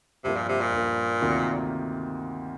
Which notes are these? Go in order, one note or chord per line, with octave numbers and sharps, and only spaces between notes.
G2 C3 F3 A#3
A#2
C3
A#2
G2 F3 A#3
D2 C3 D#3 A#3 F4